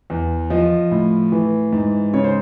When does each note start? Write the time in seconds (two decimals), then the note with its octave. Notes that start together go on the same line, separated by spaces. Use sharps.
0.10 E2
0.50 F3 D#5
0.91 A2
1.32 E3
1.73 G#2
2.14 C#3 C#5
2.24 C5